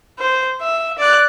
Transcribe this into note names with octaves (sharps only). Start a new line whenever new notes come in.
C5
E5
D5 F#6